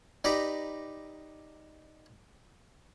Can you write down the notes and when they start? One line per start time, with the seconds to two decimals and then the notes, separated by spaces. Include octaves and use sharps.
0.24 D#4 G4 B4 D5 A#5